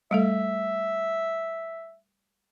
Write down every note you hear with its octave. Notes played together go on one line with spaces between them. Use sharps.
G3 A3 A4 E5